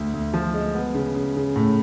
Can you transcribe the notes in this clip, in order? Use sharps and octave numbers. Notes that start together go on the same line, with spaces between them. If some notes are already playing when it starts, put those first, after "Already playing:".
Already playing: D2
D2
F3
G#3
B3
C#3
C#3
C#3
A2